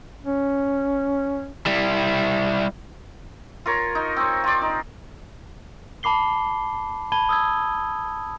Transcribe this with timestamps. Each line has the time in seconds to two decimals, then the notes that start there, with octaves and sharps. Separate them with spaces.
0.24 C#4
1.66 G3 E4
3.66 F4 A#4 C#5
3.95 D#4
4.17 C4 C#5
4.44 F4 D5
4.62 D#4
6.03 A5 B5 D6 C7 G7
7.12 A5 B5 G#6 D#7 G7
7.29 D#6 E6 G#6